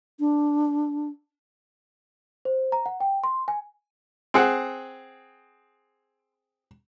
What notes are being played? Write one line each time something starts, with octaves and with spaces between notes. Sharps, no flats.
D4
C5
A#5
F#5
G5
C6
G#5
C4 G#4 F#5